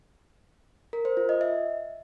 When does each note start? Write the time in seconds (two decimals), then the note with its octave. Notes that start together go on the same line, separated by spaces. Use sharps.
0.93 A#4
1.05 C5
1.17 F4
1.29 D#5
1.41 E5